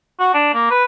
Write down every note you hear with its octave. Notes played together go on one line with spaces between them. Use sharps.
F#4
D4
A#3
B4